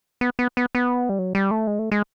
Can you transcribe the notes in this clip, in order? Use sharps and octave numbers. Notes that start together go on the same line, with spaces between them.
B3
B3
B3
B3
G3
F#3
G3
A3
G#3
A3
G#3